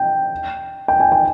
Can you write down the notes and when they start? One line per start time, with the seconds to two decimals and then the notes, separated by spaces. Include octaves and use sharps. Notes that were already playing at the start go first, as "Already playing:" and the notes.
Already playing: G5
0.88 G5
1.00 G#5
1.12 G5